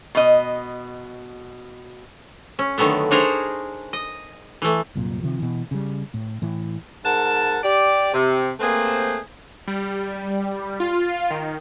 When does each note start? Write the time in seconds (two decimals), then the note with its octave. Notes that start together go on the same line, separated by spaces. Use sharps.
0.15 B2 D#5
2.59 C#4
2.78 D3 D#3 F#3 A3 B3
3.11 D4 D#4 G#4 A#4 C5 C#5
3.93 D#5
4.62 E3 A3
4.95 C2 F#2 A#2
5.22 C3 D#3 F3
5.40 B2 E3
5.71 C#3 G3
6.14 A2
6.42 A2 E3
7.04 G#2 A#4 F#5 A5
7.64 G4 D5
8.14 C3
8.60 A3 A#3 C4 G#4 B4 C5
9.68 G3
10.80 F4
11.30 D#3